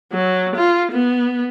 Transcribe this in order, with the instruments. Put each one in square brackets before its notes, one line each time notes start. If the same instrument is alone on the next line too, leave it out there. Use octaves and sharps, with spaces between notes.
[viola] F#3
F4
B3